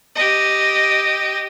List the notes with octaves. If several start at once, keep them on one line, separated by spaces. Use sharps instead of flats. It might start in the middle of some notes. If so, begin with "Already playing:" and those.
G4 D#5